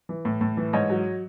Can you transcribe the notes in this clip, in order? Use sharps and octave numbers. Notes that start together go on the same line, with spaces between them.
E3
A2
A2
E3
G#2 C#5 D#5
F#3